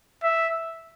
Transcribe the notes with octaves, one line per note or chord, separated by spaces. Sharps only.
E5